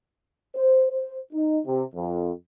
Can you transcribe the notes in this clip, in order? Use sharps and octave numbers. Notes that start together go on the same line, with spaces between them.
C5
C5
D#4
C3
F2